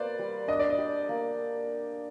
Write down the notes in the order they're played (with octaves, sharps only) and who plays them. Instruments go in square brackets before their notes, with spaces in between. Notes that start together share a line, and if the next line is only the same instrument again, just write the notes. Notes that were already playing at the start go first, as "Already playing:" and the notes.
Already playing: [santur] A#3 [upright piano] B4 C5 D5
[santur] G3
[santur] D4 [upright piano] D#5
[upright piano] D5
D#5
[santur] G4
A#3